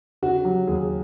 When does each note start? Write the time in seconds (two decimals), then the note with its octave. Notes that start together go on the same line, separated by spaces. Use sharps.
0.22 C#3 F#4
0.45 F#3 G4
0.67 D#2 G#4